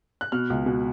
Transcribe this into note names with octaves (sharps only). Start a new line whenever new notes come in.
F#6
B2 F6
C#2
B2